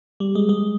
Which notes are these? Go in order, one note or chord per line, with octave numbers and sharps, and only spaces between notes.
G3
G#3
G#3